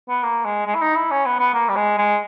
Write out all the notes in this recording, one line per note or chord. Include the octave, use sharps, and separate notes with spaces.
B3
A#3
G#3
G#3
E4
D#4
E4
C#4
B3
B3
A#3
G3
G#3
G#3